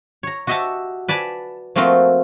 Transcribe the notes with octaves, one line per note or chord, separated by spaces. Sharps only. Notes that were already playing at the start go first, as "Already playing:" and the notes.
C#5 A#5
F#4 G4 D#5 E5 F#5 A5
B4 D5 G#5 A5
F3 A3 A#3 C4 F4 F#4